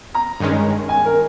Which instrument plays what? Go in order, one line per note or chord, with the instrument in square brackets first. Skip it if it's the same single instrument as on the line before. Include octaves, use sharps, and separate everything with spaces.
[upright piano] A#5
[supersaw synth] G2 D#3 G#3 C#4
[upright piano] G#5
A#4